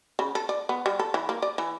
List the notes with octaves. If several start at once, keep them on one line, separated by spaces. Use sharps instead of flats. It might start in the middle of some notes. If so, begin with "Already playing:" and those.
C#3
A4
D5
B3
G3
A4
E3
A#3
D5
E3